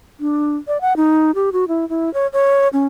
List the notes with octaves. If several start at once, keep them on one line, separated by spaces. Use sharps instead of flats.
D4
D5
F#5
D#4
G4
F#4
E4
E4
C#5
C#5
C#4